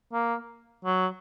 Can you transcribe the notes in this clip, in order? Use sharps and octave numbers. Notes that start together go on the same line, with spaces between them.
A#3
F#3